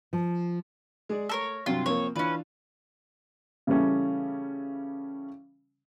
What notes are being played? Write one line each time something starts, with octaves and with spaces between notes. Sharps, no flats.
F3
G#3 G#4 D5
A3 A4 A#4 C#5
G2 C3 F#3 F4
F3 A#3 C4 C#5
E3 C#4 D4 F4 B4
C#3 E3 G3 A3 C#4